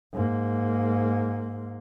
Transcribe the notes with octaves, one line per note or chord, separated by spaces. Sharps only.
G#2 A#3